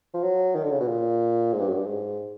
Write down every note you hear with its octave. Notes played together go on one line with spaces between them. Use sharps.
F3
F#3
D#3
D3
C#3
B2
A#2
G#2
G2
F#2
G2
G#2